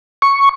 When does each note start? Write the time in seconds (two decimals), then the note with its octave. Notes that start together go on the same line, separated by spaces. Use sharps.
0.22 C#6